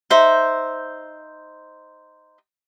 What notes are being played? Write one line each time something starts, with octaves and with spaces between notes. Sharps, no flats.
D#4 C5 E5